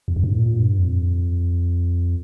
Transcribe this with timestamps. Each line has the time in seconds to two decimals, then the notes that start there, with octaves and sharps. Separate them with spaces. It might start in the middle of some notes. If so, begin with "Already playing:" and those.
0.08 E2
0.16 F2
0.24 G2
0.32 A2
0.39 A#2
0.59 G2
0.78 F2